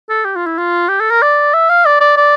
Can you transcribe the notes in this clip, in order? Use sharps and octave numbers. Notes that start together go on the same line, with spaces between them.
A4
G4
F4
E4
F4
G4
A4
A#4
D5
E5
F5
D5
D5
D5